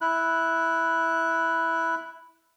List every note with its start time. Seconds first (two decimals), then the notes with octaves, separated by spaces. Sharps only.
0.01 E4 F#6